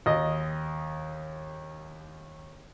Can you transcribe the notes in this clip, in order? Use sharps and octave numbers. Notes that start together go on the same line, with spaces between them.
D#2 D#5